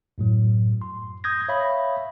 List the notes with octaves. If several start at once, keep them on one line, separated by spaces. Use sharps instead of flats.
F#2 A2 F#3
C6
D#6 G6 G#6 A#6
C#5 E5 F5 B5